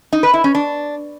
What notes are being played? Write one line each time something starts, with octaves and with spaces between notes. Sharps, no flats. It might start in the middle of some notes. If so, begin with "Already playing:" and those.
D#4
B4
E4
C#4
D4